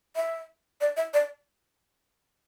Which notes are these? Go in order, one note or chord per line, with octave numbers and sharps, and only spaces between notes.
E5
D5
E5
D5